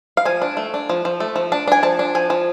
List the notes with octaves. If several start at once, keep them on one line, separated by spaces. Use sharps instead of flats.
F5
F3 G#5
D4
A3
D4
F3
F3
A3
F3
D4 A5
D4 G#5
F3 A5
D4
F3 G#5
F3